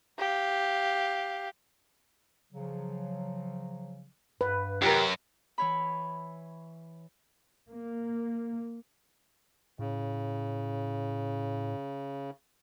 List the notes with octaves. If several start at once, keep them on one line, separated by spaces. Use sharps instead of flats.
G4 F5
C#3 F3 F#3
G2 B4
F#2 C3 D#3 A3 G4 A#4
E3 C#5 B5
A#3
A2 C#3